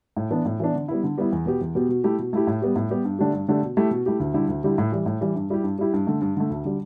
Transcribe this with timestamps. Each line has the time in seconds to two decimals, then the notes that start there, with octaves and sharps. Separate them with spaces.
0.17 A2
0.31 E3 B3 D4
0.45 A2
0.60 E3 B3 D4
0.74 D3
0.88 G3 B3 E4
1.04 D3
1.18 G3 B3 E4
1.32 E2
1.46 B2 B3 G4
1.61 E2
1.75 B2 B3 G4
1.89 B2
2.04 A3 E4 G4
2.19 B2
2.33 A3 E4 G4
2.47 A2
2.62 G3 B3 G4
2.76 A2
2.90 G3 B3 G4
3.05 G2
3.19 D3 A3 D4 G4
3.33 G2
3.48 D3 A3 D4 G4
3.63 B2
3.77 A3 E4 G4
3.91 B2
4.06 A3 E4 G4
4.20 D2
4.34 D3 G3 E4 G4
4.48 D2
4.64 D3 G3 E4 G4
4.78 A2
4.92 E3 G3
5.06 A2
5.21 E3 G3
5.36 G2
5.50 G3 E4 G4
5.64 G2
5.79 G3 E4 G4
5.94 G2
6.07 D3 A3
6.21 G2
6.37 D3 A3
6.50 D2
6.65 D3 G3